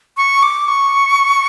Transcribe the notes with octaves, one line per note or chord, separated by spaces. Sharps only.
C#6
D6
C#6